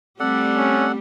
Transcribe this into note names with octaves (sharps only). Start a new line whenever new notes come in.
G3 A3 C4 G4 A4 D5 F#5
C#4